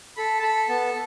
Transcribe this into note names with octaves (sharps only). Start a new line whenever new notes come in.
A4 B5
A5
A4 B5
B3 A5